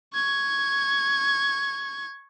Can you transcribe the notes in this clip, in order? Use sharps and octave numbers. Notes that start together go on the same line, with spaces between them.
C#6 G#6